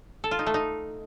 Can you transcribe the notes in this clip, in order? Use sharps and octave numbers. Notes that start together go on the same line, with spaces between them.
A4
F4
D#4
A3
D#4